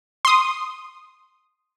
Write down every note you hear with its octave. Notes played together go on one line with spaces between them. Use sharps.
C6 D#6